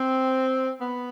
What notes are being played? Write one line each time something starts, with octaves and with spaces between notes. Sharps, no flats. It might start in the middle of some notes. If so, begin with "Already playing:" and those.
Already playing: C4
B3